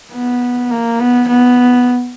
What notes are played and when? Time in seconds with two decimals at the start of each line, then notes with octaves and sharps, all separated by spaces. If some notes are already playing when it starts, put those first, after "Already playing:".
0.14 B3
0.71 A#3
0.99 B3
1.28 B3